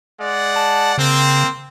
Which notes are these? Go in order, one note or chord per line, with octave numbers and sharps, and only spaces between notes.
G#3 D5 F#5
A5
C#3 A#3 C4